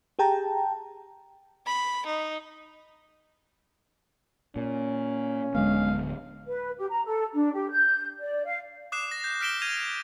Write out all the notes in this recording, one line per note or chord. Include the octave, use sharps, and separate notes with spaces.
G4 G#4 G5 A5 A#5
B5
D#4
A#2 C#4
D1 D3 G#3 B3 F5
B4
G4
A#5
A4
D4
G4
G6
D5
F5
D6 D#6 F#6 C7 E7
A#6
G6
F6 B6 D7 E7 G7
F6 G#6 A#6 D#7 F7